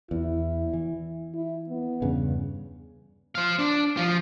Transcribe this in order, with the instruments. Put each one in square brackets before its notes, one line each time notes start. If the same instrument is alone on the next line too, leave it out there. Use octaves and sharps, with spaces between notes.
[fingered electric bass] E2 [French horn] E4
[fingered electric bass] E3
[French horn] E4
B3
[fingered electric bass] E2 G2 C#3
[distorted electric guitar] C5 F5
D4
F3 F4